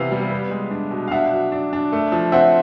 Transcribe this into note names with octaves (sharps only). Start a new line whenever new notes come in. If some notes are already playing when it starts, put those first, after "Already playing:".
Already playing: C3 E3 B3 F5
G3
B3
G#3
D4
B2
F5
D4 E5 F#5
F#3
D4
D4
A3
F3
C4 E5 F#5